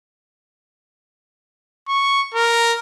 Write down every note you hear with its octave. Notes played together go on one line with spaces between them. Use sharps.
C#6
A#4